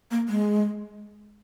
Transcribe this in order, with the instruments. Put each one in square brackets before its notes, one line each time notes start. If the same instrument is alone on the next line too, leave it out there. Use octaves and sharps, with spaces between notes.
[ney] A#3
G#3